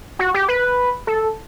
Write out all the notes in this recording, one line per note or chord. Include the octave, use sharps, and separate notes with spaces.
F#4
G4
B4
A4